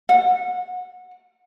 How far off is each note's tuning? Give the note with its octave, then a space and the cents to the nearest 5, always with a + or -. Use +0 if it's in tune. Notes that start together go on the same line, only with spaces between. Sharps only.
F#5 -20